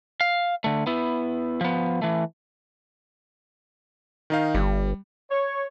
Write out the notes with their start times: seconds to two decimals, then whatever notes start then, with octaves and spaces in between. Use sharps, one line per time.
0.21 F5
0.64 D3 A3
0.87 B3 E4
1.61 F3 B3
2.02 E3 A3
4.30 D#3 D#4 F5
4.55 G1 G3
5.31 C#5